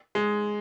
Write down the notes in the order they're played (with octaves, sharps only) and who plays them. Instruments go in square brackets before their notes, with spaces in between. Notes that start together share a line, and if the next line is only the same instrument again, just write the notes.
[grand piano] G#3